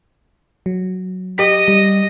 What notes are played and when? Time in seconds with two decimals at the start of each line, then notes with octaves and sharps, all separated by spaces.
0.66 F#3
1.38 G4 D#5 B6
1.68 G3